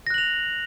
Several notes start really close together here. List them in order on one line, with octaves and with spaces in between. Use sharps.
A#6 F#6 F#7 F7